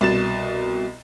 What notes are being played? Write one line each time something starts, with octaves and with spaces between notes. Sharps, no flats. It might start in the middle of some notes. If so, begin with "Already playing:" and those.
C2 B2 A6 E7